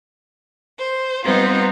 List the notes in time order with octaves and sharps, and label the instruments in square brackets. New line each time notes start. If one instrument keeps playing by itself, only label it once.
[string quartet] C5
G3 B3 C4 D#4 F4